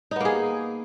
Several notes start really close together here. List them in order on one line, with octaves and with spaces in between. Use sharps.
D#4 B3 A#3 G#4